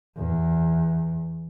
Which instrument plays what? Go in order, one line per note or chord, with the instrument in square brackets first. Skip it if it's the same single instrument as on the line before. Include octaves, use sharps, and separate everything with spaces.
[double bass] E2